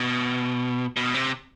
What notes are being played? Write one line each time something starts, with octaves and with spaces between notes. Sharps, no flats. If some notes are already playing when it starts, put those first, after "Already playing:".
Already playing: B2
B2
C3